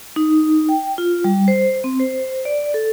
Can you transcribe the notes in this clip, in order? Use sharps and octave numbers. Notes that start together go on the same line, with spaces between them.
D#4
G5
F4
G3
C5
C4
C5
D5
A4